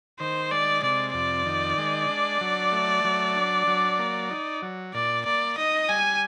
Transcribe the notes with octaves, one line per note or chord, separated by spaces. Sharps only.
D#3 C5
G#3 D5
C3 D5
F2 D5
D#3
G#3
D4
F#3
A3
F#3
D4
F#3
A#3
D#4
F#3
A#2 D5
A#3 D5
D#4 D#5
G3 G#5